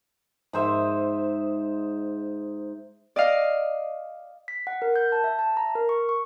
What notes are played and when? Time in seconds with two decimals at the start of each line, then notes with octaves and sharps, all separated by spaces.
0.53 G#2 G#4 C5 E5
3.16 D5 D#5 F5
4.48 B6
4.67 F#5
4.82 A#4
4.96 G6
5.12 A5
5.24 E5
5.39 A5
5.57 A#5
5.75 A#4
5.89 C#6
6.09 C#6